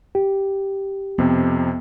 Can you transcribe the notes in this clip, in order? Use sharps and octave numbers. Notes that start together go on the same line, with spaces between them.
G4
F2 C3 B3